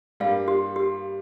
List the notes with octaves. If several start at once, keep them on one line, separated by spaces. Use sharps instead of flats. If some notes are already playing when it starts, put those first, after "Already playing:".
G2 G3 A#3 F5
G4
G4